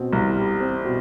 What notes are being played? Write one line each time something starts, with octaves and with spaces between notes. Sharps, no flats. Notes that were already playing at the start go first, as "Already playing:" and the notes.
Already playing: B2 C4
C2
G3
C4
B2